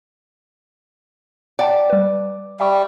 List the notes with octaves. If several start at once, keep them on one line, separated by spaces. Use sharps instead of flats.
D5 F#5 G5 A5
G3 B4
G3 E5 G5 C#6